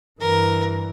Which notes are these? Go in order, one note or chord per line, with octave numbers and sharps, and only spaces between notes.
G2 E3 A#4